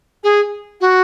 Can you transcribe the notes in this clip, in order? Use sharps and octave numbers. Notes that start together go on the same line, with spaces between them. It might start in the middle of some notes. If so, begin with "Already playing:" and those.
G#4
F#4